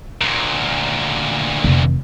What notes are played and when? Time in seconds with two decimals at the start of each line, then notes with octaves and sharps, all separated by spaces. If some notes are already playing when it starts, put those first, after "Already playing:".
0.21 D2 A#2
1.64 F1